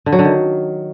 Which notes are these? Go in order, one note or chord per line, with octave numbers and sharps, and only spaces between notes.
D3
F#3
D3
D#3